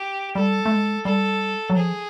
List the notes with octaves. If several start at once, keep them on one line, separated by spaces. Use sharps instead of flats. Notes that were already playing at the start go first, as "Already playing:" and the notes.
Already playing: G4
G3 A4
A3
G#3
G3 A4
F#3
F3 G#4